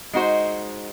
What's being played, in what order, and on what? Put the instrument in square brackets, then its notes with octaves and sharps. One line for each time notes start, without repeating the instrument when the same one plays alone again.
[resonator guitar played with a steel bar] G#3 D#4 F#4 C5